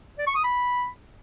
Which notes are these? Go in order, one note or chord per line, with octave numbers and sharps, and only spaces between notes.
D5
C#6
D#6
B5